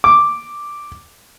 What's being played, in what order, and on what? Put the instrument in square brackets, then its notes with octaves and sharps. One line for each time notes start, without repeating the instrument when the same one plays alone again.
[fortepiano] D6